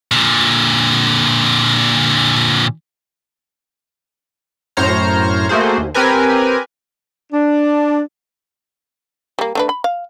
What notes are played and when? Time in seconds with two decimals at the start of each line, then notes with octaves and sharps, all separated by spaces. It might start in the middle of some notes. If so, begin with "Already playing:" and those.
0.12 A#2 D3
4.77 F#2 A2 C5 C#5 A#5 F6
5.49 A3 A#3 F#4 G#4 C5
5.78 D#2
5.94 C4 G4 A#4 B4 G#5
7.33 D4
9.39 G3 A#3
9.55 A3 D4 B4
9.69 B5
9.84 F5